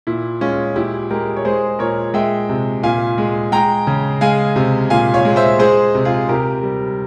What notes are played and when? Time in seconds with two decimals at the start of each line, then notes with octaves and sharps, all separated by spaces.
0.07 A#2 E4
0.41 G#3 C#4 F4
0.75 A#2 E4 G4
1.10 G#3 G4 A#4
1.36 C#5
1.45 G#3 G#4 C5
1.79 A#2 A#4 C#5
2.14 G#3 E5 G5
2.49 C3
2.83 A#2 F5 G#5
3.18 G#3
3.52 G#3 G5 A#5
3.87 C#3
4.21 G#3 F5 G#5
4.56 C3
4.90 A#2 F5 G#5
5.14 C#5 F5
5.25 G#3
5.36 C5 E5
5.59 G#3 G#4 C5
5.95 C3
6.05 F4 G#4
6.29 C3 G4 A#4
6.63 G3